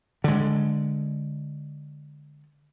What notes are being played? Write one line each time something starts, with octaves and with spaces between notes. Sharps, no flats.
D3 G#3